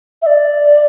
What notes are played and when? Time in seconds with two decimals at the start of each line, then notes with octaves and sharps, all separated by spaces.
0.22 E5
0.27 D5